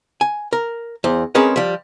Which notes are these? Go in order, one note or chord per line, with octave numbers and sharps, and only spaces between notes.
G#5
A#4
E2 C5
G#3 C4 C#4 G#4 A#4 B4
F3 G3